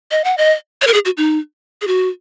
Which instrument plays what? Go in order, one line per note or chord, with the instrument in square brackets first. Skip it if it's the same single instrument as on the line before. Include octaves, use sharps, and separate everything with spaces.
[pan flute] D#5
F#5
D#5
C#5
A#4
G#4
F#4
D#4
G#4
F#4